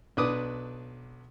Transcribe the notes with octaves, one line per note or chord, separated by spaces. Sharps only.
B1 D4 B4 D6 D#6